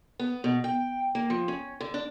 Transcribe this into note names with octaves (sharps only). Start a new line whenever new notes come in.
B3
B2
G5
A#3
F3
C#4
D3
D4